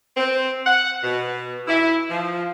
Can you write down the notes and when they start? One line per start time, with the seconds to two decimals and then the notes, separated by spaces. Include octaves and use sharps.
0.17 C4
0.65 F#5
1.02 B2
1.67 E4
2.09 F3